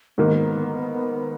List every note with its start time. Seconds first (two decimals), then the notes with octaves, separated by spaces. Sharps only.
0.18 G#2 D#3 A#3 B3